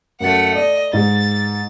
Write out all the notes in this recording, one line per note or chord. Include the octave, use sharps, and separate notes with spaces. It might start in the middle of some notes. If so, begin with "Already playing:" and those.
F#2 A3 F#5
D5 D#5
G#2 A6